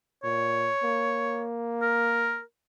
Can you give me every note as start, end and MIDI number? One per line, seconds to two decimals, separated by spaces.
0.24 0.70 46
0.24 1.44 73
0.83 2.41 58
1.82 2.41 70